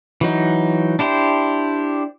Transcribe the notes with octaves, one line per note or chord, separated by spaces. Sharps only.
E3 F#3 D#4
D4 E4 G4 C5